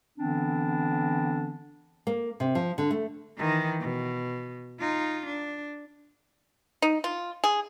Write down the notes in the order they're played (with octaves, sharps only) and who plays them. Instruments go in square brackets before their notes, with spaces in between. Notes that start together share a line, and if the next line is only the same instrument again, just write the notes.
[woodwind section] D3 E3 B3 C4 D4
[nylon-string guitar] A#3
C3
F3
D3
A3
[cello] D#3 E3
B2
D#4 F4
D4
[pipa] D#4
F4
G#4